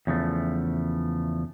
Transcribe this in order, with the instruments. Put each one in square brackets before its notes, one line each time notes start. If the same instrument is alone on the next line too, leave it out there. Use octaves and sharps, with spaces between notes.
[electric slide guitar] E2 C#3 F3 A3